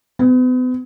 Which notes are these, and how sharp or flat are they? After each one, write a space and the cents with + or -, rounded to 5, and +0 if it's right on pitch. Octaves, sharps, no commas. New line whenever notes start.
B3 +40